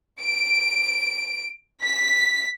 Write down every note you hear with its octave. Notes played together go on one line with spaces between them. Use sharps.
D7
B6